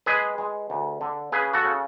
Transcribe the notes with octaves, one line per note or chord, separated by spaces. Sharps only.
G#3 G#4 B4
G#3
D2
D3
C#3 G#4 B4
F#4 A4
C#3